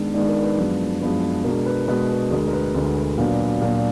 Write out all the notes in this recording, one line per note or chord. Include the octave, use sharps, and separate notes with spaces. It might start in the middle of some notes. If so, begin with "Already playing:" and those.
Already playing: G#2 D#3 G#3 B3 D4
G#2 D#3 G#3 B3 D4 D5
A#4
B4
F#2 F3 G#3 B3 D4
F#2 F3 G#3 B3 D4
B2 G#3 D4 A#4
B4
B2 G#3 D4 B4
B4
D2 D3 G#3 A#4
A#4
B4
D2 D3 G#3
B4
A#2 F#3 B3 D4
A#2 F#3 B3 D4